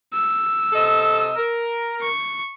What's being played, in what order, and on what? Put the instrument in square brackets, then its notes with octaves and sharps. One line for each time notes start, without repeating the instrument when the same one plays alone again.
[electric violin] E6
[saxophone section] C3 A4 D#5
A#4
[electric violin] C#6